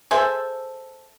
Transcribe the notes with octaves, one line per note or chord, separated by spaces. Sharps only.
G#4 A4 C5 E5